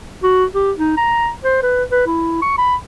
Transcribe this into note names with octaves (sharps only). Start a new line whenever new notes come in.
F#4
G4
D#4
A#5
C5
B4
B4
E4
C#6
B5